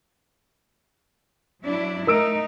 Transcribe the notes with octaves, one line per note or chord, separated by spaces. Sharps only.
F#3 D4 E4
A3 D#4 A#4 E6 D7